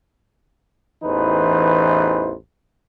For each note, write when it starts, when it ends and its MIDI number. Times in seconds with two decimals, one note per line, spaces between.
1.03 2.34 33
1.03 2.34 40
1.03 2.34 52
1.03 2.34 63
1.03 2.34 71
1.03 2.34 72